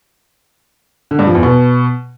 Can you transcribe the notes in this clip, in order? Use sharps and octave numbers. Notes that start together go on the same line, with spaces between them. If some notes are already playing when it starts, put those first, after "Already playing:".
D3
G2
F3
E2
B2